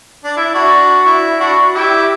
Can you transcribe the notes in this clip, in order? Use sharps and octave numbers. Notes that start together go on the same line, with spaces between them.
D4
E4
D4 F#4
E4
D4 F#4
E4 G4